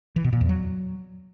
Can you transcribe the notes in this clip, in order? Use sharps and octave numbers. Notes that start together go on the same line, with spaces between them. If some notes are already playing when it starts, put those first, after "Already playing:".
E3
B2
A#2
E2
F#3